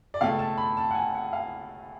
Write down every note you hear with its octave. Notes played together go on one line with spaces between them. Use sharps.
D5
C#2 B2 A3 F5
A5
B5
A5
F#5
G#5
F#5
F5